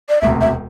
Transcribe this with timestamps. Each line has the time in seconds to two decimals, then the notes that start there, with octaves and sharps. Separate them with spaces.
0.09 D5
0.22 E1 D2 C3 E5
0.41 E5